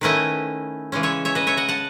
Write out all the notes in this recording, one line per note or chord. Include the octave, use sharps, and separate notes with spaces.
D#3 A3 C#4 E4 B4 D#5
C#3 E3 G#3 C#4
C#5 E5
C#5 E5
B4 D#5
C#5 E5
D#5 F#5
F#5 A5